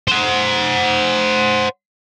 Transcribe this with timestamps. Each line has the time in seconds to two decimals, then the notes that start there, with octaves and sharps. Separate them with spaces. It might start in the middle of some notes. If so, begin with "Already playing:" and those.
0.08 C5 F#5